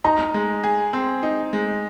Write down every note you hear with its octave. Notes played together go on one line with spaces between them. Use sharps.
D#4 A#5
G#3
G#4
C4
D#4
G#3